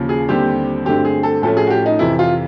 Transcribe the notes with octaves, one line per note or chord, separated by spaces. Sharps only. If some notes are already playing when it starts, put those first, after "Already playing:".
Already playing: D#2 C#3 F3
G#4
D#2 D3 G3 C4 G4
G2 D3 F#3 A3 C4 G4
G#4
A4
A2 F3 A3 C#4 A4
G#4
F#4
G4
D#4
F2 C3 E3 E4
F4